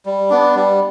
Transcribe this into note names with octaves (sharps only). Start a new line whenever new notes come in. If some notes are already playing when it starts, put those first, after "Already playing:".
G3
B3 D4
G3